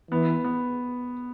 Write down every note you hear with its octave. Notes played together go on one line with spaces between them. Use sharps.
E3 B3
B3